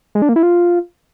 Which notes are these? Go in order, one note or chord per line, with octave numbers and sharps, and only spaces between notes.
G#3
D4
A#3
E4
F4